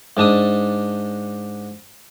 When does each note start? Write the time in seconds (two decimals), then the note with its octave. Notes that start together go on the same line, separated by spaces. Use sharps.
0.17 G#2 D4 A5 D#6